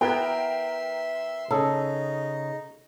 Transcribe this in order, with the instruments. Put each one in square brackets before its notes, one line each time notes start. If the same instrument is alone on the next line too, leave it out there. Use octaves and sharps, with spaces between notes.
[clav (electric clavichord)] B3 E4 [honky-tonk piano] A#4 G5 [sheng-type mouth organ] E5 C6
[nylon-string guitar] C#3 [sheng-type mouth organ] D#4 [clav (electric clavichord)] A4